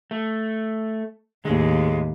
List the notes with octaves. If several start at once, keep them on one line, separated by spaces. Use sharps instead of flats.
A3
D#2 A2 G#3